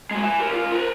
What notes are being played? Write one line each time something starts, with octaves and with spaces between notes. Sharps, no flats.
G#3 F#4
E5 G#5
G4 A#4
C#2 F4
A#4 B4